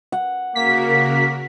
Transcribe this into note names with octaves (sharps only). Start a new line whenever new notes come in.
F#5
C#3 A#3 F#4 A#4 B6